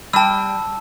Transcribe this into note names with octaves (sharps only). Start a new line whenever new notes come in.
G3 G5 A5 E6